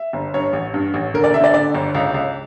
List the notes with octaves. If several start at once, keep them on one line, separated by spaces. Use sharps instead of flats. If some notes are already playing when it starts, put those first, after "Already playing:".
Already playing: E5
G1
G2 C#5
A1
G2
A1
D3 A#4
D5
D3 E5
D5
D3 D5
G1
C#2
C#2